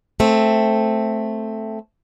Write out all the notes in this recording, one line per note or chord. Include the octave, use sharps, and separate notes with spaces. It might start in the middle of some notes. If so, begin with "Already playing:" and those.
A3 C4